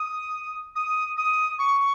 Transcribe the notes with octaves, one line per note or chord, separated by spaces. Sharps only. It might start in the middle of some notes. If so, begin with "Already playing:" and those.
Already playing: D#6
D#6
D#6
C#6